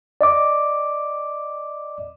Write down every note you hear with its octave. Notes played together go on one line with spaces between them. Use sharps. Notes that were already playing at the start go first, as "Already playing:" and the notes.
D5 D#5 D6